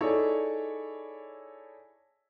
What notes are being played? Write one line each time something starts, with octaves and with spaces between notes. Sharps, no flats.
D#4 E4 G#4 A4 C#5 D5